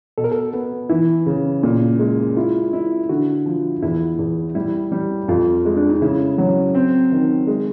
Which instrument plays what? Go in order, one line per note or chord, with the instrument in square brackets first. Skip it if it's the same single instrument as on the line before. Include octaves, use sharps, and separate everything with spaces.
[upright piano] B2 [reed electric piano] A4
[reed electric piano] A#4
A4
[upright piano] B3
[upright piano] E3 [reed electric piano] E4
[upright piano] C#3
A#2
G#3
[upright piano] E4 [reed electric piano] F4
[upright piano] E4
[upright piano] D3 [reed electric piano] F#4
[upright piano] F3
[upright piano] E2 [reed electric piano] E4
[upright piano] E2
[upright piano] G3 [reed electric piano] E4
[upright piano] G3
[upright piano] F2 [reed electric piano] F4
[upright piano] G#3
[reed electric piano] D4
D#4
[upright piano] C#3 [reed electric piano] E4
[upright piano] F#3
C4
D#3
G#3